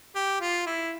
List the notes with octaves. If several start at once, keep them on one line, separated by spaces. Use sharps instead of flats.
G4
F4
E4